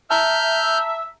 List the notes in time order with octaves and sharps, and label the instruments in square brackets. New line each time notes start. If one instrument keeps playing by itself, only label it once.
[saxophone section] E5 [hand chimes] A5 A#5 [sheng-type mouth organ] F6 G6